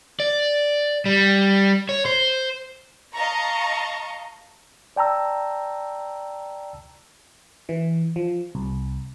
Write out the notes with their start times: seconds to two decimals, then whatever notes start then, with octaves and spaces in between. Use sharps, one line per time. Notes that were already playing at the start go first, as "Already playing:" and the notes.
0.20 D5
1.06 G3
1.89 C#5
2.06 C5
3.14 D#5 F5 A5 A#5 C#6
4.96 D5 G5 A5 A#5 E6
7.69 E3
8.16 F3
8.55 C2